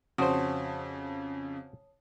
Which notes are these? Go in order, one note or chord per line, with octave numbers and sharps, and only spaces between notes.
F2 C#3 F#4 C5 C#5 A5 D#6 D7